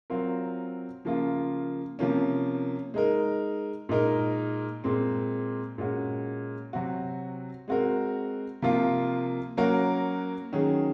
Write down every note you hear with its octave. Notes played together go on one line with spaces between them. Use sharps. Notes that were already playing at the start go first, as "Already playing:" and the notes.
F#3 C4 F4 A#4
C#3 F3 A#3 F4
C3 F3 A#3 C#4
G#3 D#4 A#4
A#2 G#3 D#4 A#4
A#2 G#3 C4
A#2 G#3 C#4 F#4
C3 F#3 C4 F#4
G#3 C4 F#4 A#4
C3 F3 A#3 F4
F#3 A#3 C#4 F#4 A#4
D#3 F#3 C#4 G#4